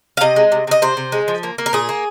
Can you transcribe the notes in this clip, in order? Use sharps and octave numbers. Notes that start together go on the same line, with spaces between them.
F5
C3 D#5
G#3
C3
C3 D#5
C3 C5
C3
G#3
F3
A#3
A#3
A#4
A#2 G#4
A#3